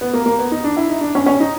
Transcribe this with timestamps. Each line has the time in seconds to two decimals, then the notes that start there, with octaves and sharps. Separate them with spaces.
0.01 B3
0.14 A#3
0.26 A#3
0.39 B3
0.52 D#4
0.64 D4
0.77 E4
0.89 D#4
1.01 D4
1.15 C#4
1.26 C#4
1.40 D#4